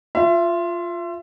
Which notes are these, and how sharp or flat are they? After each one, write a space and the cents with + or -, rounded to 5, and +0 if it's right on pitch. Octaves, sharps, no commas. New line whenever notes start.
F4 +0 E5 +35